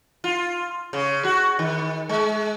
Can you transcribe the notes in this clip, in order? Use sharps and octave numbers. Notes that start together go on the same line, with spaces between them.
F4
C#3
F#4
D#3
G#3